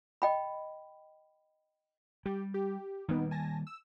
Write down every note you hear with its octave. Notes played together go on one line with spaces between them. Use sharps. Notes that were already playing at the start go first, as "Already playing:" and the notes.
D#5 G5 B5
G3 G4
G4
D#3 G3 A#3 B3 D#4
G#5 A5 A#6
E6